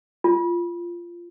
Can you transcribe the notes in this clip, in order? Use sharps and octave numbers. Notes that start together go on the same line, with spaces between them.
F4